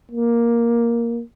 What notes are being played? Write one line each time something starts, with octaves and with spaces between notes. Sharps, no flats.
A#3